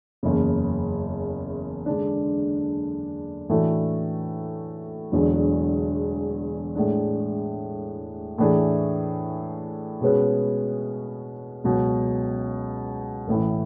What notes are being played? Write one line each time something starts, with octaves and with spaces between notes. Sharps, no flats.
F#1 E2 C#3
D3 G#3 D4
A2 E3 A3 D4 F#4
E1 E2 D3 F#3
A2 G#3 D4
A2 E3 A3 D4 G#4
B2 G#3 C#4 G#4 B4
C#2 B2 F#3
A1 A2 E3